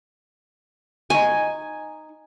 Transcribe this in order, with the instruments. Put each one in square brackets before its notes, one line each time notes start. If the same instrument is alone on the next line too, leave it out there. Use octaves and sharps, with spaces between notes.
[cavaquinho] D#4 G#4 C#6 [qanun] G#5